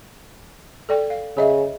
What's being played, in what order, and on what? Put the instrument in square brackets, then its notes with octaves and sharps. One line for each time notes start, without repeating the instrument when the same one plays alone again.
[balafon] A4 D5 G5
F5
[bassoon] C#3 [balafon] G#4 D#5 E5